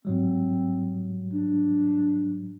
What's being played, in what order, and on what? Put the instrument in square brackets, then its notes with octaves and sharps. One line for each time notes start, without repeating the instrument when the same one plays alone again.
[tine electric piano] G#2 F#3 G3 [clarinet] C4
[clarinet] D4